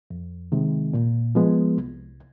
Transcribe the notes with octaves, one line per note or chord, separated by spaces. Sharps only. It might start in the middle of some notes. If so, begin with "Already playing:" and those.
F2
C3 D#3 G#3
A#2
F3 G#3 B3
C2